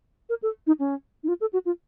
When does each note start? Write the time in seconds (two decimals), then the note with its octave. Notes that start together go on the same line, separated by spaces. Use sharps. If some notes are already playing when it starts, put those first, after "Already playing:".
0.29 A#4
0.43 A4
0.67 D#4
0.79 C#4
1.23 D#4
1.28 F4
1.41 A4
1.53 F#4
1.65 F4